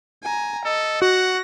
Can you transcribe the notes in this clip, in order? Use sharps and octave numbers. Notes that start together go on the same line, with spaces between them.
G#5 A#5
A4 D#5
F#4 F#5 A#6